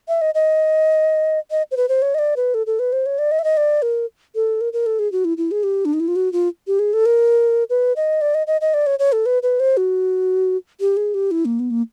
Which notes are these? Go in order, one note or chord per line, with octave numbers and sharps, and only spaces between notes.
E5
D#5
D#5
D#5
C5
B4
C5
C#5
D#5
D5
B4
A4
A4
B4
C5
C#5
D5
D#5
E5
D#5
D5
A#4
A4
A#4
A#4
A4
G#4
F#4
E4
E4
G#4
G4
D4
D#4
E4
F4
F#4
F4
G4
G#4
A4
A#4
B4
D#5
D5
D#5
D#5
D#5
D5
C#5
C#5
A4
B4
B4
C5
F#4
G4
G#4
G4
E4
A#3
B3
A#3